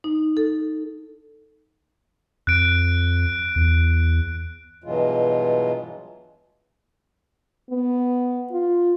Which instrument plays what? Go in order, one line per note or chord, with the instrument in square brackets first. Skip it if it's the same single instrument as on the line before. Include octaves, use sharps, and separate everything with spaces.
[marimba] D#4
A4
[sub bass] F2 [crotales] F#6 D7
[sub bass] E2
[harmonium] G2 B2 E3 F#3 G#3 F4
[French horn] B3
F4